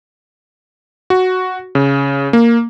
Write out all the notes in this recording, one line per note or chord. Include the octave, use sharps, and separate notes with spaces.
F#4
C#3
A#3